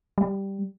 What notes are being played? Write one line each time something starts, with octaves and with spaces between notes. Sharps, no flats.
G3